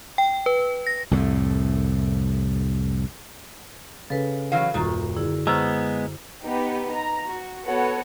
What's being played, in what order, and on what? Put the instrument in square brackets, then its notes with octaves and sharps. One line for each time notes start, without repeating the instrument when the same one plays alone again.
[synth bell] G5
B4
A#6
[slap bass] C2 F2 A2
[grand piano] C#3 [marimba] A4 B4
[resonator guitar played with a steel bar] E3 F#3 F5
[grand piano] D#1 [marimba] F#2 F#4 A#5 [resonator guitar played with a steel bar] D#3
[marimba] D3 E4 G#4
[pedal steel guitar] G#3 B3 [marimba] C5 F6 [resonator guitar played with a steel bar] A#5 [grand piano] E6
[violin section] B3 D#4 G4
A#5
F#4
B3 F#4 A4 C#5 F#5